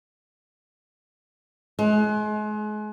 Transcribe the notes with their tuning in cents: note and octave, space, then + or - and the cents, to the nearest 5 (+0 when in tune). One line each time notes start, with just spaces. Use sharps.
G#3 +35